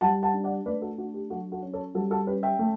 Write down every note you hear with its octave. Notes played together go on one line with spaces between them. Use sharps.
G3 F#5 A5
F#5 A5
D4
D5 F#5
A3 B4 D5
F#4 A4
D4 F#4
G4
F#3 F#4 A4
F#4 A4
C#4
A4 C#5
G3 F#4 A4
F#4 A4
C#4 G4 B4
E5 G5
A3